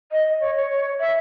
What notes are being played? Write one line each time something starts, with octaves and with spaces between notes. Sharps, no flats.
D#5
C#5
C#5
E5